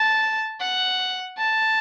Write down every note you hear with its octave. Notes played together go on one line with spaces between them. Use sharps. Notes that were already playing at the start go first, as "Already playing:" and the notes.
Already playing: A5
F#5
A5